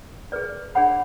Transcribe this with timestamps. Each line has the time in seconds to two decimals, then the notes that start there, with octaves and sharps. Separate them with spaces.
0.32 G#4 B4 D5
0.75 D4 G#4 C#5 F#5 B5